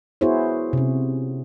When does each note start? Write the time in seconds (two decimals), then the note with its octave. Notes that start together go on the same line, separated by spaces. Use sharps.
0.21 B3 E4 F#4 G#4 C5 C#5
0.73 C3 C#4